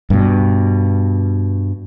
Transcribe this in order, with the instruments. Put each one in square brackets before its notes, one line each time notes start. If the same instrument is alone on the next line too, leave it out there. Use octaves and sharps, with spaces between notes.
[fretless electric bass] G2 B2